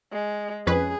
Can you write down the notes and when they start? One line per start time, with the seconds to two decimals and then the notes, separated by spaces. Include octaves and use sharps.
0.12 G#3
0.67 F2 C#4 G#4 B4